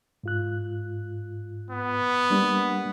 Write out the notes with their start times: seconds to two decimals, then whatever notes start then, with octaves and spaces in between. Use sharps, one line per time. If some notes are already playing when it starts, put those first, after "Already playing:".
0.24 G#2 F4 F#6
1.70 B3
2.30 G3 A#3 D4